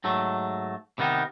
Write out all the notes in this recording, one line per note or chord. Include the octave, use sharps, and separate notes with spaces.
G#2 F#3 A3
C3 D#3 B3 D#4